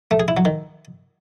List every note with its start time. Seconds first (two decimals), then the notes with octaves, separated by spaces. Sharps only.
0.11 A3
0.20 G#4
0.28 E4
0.37 F#3
0.45 D#3